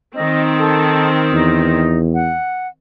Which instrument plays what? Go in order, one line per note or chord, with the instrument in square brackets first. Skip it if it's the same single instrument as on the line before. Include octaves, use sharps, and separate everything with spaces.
[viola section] D#3 C4 [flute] D#5
[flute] A4
[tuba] E2 [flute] D#4
[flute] F#5